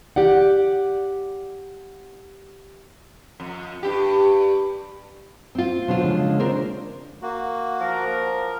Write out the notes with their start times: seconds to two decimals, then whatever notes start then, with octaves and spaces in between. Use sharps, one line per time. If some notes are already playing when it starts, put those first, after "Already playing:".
0.16 G4 D5 F#5
3.40 F2
3.83 G2 G4
5.55 C4 F4
5.88 B2 D3 F#3 F4 C5
6.03 C#3 F3 G#3
6.40 C4 D4 A#4 C5
7.22 A#3 F#4
7.80 F3 A#4